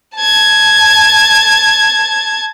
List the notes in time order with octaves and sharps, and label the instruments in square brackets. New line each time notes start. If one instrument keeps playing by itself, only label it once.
[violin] A5 G#6